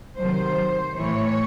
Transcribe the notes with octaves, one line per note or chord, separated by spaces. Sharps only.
C3 D#3 F#3 C5
A2 E3 C#5